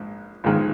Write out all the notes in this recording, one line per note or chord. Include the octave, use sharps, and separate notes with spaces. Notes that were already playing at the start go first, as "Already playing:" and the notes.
Already playing: A#1 G#2
A#1 G#2 D#3 G#3